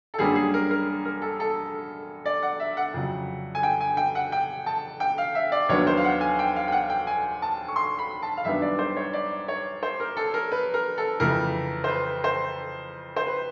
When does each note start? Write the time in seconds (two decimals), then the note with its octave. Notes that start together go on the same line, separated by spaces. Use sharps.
0.14 A4
0.19 F#2 D3 G3 A#3 C#4 G#4
0.36 G#4
0.54 A#4
0.71 A#4
1.05 A#4
1.22 A4
1.40 A4
2.26 D5
2.43 F#5
2.60 E5
2.77 F#5
2.94 F2 C#3 F#3
3.55 G#5
3.63 G5
3.81 G#5
3.97 G5
4.15 F#5
4.32 G5
4.66 A5
5.00 G5
5.18 F5
5.35 E5
5.52 D5
5.69 D#2 D#3 F#3 B3 D4 C#5
5.87 C5
5.97 F5
6.04 F#5
6.21 G#5
6.39 G5
6.56 F5
6.68 G5
6.72 F#5
6.90 G5
7.07 G#5
7.42 A5
7.68 C#6
7.76 C6
7.99 B5
8.22 A5
8.37 F5
8.45 F#2 D#3 G3 B3 D4 E5
8.62 D5
8.79 C5
8.97 C#5
9.13 D5
9.48 C#5
9.83 C5
10.00 A#4
10.17 A4
10.34 A#4
10.52 B4
10.74 A#4
10.98 A4
11.20 F2 C#3 E3 A3 A#4
11.84 C5
11.89 B4
12.24 C5
13.16 C5
13.27 B4